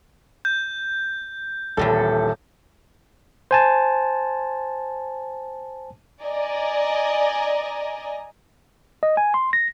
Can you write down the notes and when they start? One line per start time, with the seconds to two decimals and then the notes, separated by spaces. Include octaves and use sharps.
0.45 G6
1.77 D#1 E2 A2 A4
3.51 C5 G#5 A5
6.22 D5 D#5 G#5 A#5
9.03 D#5
9.17 G#5
9.34 C6
9.53 A#6